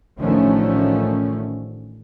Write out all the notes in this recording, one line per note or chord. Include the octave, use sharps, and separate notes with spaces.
A1 D3 D#3 F3 A3 C#4